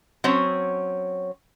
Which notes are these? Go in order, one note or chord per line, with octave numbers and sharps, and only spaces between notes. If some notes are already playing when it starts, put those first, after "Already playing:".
F#3 C4 C#4 C#5